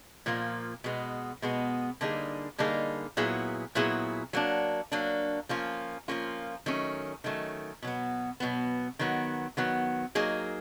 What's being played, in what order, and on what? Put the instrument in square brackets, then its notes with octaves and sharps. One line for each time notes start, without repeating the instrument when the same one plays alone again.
[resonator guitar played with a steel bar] A#2 F3 A#3
B2 G#3 B3
B2 G#3 B3
D3 G3 A#3 D#4 G#4
D3 G3 A#3 D#4 G#4
A#2 F#3 B3 E4 G#4
A#2 F#3 B3 E4 G#4
F#3 A#3 D4
F#3 A#3 D4
F3 A#3 C#4 F4
F3 A#3 C#4 F4
D#3 F#3 A3 C#4
D#3 F#3 A3 C#4
B2 F#3 B3
B2 F#3 B3
D#3 F#3 B3
D#3 F#3 B3
F#3 A#3 D#4 G#4